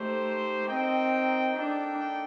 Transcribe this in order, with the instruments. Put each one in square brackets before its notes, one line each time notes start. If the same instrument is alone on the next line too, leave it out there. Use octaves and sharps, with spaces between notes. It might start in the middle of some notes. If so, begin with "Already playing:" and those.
Already playing: [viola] A3 [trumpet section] D#4 G4 C5
[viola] C4 [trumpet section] D#4 A#4 D#5 G5
[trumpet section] A#3 D#4 A4 D5 G5 [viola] D4